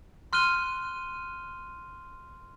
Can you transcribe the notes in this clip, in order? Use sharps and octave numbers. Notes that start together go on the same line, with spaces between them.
C6 F6 F#6 D#7 G7